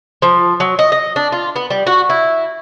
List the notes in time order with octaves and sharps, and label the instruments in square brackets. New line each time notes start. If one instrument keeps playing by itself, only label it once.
[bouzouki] F3
F#3
D#5
D#5
D4
F4
B3
G3
F#4
E4